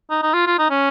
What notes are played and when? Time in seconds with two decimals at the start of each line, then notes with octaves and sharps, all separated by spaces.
0.10 D#4
0.22 D#4
0.34 F4
0.47 F4
0.58 D#4
0.70 C#4